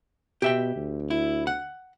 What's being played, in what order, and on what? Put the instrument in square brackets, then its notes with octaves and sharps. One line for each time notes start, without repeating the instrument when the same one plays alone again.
[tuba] B2 [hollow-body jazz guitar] G4 E5 G5
[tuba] D2
[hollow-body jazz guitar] E4
F#5